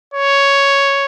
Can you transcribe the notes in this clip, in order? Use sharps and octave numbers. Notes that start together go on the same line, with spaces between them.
C#5